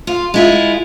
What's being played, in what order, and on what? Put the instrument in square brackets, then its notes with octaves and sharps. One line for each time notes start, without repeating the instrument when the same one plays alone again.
[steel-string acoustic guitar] F4
G#3 E4 F4